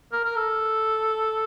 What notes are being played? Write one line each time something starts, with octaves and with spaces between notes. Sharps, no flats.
A#4
A#4
A4